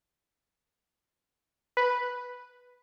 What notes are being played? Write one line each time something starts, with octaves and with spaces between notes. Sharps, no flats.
B4